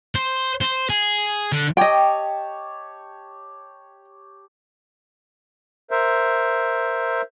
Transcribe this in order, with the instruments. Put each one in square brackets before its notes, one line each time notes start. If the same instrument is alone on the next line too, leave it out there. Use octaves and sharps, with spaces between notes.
[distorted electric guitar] C5
C5
G#4
D3
[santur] G4 C#5 A5 [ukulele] D#5 G5
[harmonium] A#4 C5 E5